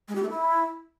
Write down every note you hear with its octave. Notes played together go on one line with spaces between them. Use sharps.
G#3
G4
A3
E4